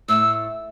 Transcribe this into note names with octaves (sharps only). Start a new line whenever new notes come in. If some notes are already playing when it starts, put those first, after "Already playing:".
A2 E6